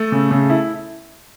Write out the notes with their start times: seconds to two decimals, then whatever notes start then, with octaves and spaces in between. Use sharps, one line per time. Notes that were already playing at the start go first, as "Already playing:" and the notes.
Already playing: A3 A4
0.12 C#3
0.31 C#3
0.50 E4